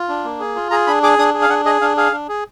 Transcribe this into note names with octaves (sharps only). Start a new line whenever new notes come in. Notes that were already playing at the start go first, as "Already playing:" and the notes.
Already playing: F4
D4
A#3
G#4
F4
G#4 A#5
D4 B5
G#4 D6
D4 D#6
G#4
F5
D4 F#5
G#4 D#5
D4 F5
G#4 F5
D4
G#4